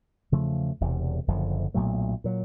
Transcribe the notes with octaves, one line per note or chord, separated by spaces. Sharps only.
E2 C#3 F3 A3
E1 E2 C3
F#1 F#2 D3 F3
B1 A#2 F#3 A3
A#2 F#3